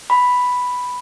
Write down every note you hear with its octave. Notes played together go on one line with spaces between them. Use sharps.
B5